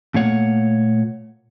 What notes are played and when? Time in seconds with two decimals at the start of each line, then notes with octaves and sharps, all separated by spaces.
0.14 A#2 A3 A#3 C#5 F#5